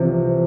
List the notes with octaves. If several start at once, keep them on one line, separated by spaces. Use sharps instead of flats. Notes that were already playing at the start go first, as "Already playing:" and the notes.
Already playing: C2 C3 E3 F3